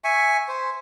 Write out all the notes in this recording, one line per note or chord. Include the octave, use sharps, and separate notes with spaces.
E5 G#5 C#6
C5